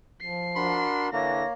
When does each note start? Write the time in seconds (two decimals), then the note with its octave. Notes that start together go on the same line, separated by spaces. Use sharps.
0.21 F3 C7
0.56 D4 F#4 A#4 B5 C6
1.13 D3 E3 A#3 C#5 A#6